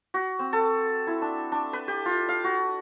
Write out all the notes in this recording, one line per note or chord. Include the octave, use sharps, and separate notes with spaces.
F#4
C4
A4
E4
D4
D4
B4
G4
F4
F5
F#4